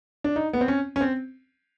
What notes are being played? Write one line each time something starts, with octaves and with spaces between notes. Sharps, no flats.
D4
D#4
B3
C4
C#4
C#4
C4